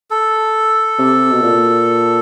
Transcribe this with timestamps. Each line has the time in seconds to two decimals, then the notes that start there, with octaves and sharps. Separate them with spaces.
0.11 A4
0.99 C3
1.32 B2
1.43 A#2